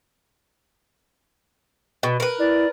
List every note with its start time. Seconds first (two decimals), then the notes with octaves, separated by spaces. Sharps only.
2.03 B2
2.20 A#4 B4
2.39 E4 D5